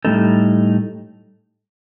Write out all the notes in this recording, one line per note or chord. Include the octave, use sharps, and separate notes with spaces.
A2 G3 B3 D#4 A4